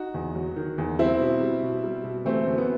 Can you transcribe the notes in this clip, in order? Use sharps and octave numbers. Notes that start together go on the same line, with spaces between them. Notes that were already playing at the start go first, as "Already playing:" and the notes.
Already playing: D#4 F#4
E2
F#3
D#3
E2
G3 C4 E4
B2
G3
B2
G3
B2
E3 A3 C4
F#2
B3